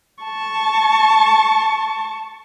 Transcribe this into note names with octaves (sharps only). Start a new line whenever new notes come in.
A5 C#6